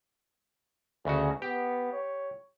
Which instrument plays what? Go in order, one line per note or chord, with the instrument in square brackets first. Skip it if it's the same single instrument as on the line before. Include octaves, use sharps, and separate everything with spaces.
[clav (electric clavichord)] D2 C#3 F#4 [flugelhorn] G#4
[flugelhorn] B3 [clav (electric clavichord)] G4
[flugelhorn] C#5